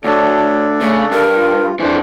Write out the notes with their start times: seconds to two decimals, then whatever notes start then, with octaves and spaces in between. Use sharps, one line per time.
0.04 D2 D4 A4 C#5 D5
0.81 C#3 A3
1.11 G2 A#4
1.36 F4
1.80 F2 E3 D4 C5